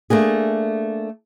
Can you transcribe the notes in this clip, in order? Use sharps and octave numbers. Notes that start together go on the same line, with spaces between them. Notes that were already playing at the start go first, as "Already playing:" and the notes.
A3 A#3 D4 G#4